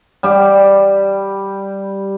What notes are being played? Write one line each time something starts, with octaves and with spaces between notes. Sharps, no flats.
G3 G4